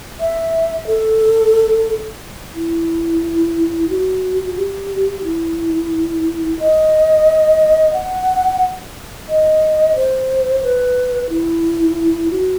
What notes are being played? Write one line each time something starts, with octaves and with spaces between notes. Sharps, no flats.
E5
A4
E4
F#4
G4
E4
D#5
F#5
D#5
C5
B4
E4
F#4